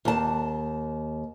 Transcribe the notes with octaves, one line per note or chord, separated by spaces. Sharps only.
D#2 A5